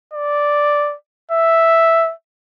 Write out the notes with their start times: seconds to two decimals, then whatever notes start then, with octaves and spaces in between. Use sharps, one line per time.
0.14 D5
1.31 E5